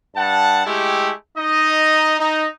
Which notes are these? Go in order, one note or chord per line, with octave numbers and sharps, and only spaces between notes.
G2 F#5 A5
G#3 A3 E4 G4
D#4 D#5
D#4